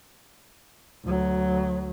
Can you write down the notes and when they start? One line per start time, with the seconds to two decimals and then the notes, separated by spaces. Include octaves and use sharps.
1.05 D2 F#3